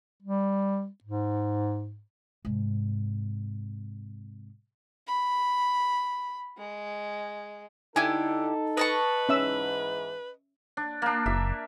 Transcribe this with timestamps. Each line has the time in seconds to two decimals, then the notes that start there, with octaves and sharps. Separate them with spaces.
0.22 G3
1.04 G#2
2.45 G#2 C3
5.07 B5
6.58 G#3
7.96 D3 D#4 E4 G4 A4 G#5
8.77 B4 D#5 A5 C#6
9.29 G#2 E3 C#4 E5 E6
10.77 D4
11.02 A#3 D4
11.26 F#1 E5